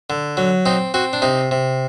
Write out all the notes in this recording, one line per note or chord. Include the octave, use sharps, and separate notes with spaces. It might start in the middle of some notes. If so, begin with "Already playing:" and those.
D3
F#3
C4 D#4
C4 F#4
D4
C3 D#4
C3